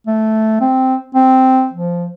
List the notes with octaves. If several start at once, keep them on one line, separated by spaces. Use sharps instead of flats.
A3
C4
C4
F3